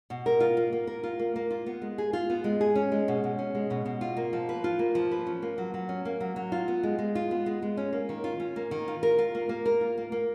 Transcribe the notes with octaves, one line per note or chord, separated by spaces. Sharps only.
B2
A#4
F4
A#3
A#3
A#4
F4
A#3
A#3
F4
B3
G#3
G#4
F4
B3
G#3
G#4
C#4
G#3
B2
B2
C#4
G#3
B2
B2
F4
A#3
F3
B4
F4
A#3
F3
B4
C#4
A#3
F#3
F#3
C#4
A#3
F#3
F#3
F4
B3
G#3
G#3
F4
B3
G#3
G#3
C#4
A#3
D#3
F4
C#4
A#3
D#3
F4
A#4
F4
A#3
A#3
A#4
F4
A#3
A#3